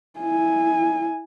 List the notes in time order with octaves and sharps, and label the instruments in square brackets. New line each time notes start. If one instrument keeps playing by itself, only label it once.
[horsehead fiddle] E4 G#5